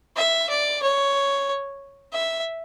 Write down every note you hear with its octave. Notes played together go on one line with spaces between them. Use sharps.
E5
D5
C#5
E5